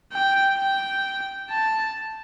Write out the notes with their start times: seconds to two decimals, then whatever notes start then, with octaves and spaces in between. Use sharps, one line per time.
0.12 G5
0.58 G5
1.50 A5